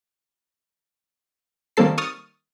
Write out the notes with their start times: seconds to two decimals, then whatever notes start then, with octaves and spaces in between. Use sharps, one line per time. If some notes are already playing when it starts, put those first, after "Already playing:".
1.77 D#3 G3 A#3 C4 A4 C7
1.98 C#6 D#6 F6 A6